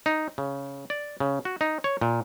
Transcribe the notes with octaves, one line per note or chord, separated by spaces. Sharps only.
D#4
C#3
D5
C#3
F#4
D#4
C#5
A#2